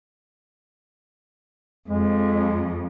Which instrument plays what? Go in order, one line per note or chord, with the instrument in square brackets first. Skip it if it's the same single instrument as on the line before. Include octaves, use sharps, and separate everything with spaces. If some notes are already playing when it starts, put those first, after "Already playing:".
[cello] F2 [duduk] G#3